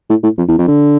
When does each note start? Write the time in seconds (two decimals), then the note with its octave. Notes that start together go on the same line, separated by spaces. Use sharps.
0.10 A2
0.23 A2
0.38 F2
0.49 E2
0.58 F2
0.68 D3